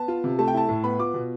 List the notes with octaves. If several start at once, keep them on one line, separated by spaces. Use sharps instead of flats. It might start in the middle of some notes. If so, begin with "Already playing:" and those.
Already playing: B3 A5
F4
C3
A3 A5
G5
E4 A5
A2
B3 B5
F4 D6
B2